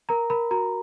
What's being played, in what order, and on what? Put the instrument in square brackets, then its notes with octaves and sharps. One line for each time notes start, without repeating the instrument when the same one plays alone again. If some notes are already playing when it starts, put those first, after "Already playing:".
[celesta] A#4 A#5
A#4 B5
F#4 A#5